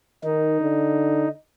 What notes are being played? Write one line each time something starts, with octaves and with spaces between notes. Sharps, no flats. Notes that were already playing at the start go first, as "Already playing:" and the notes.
D#3 D#4
D3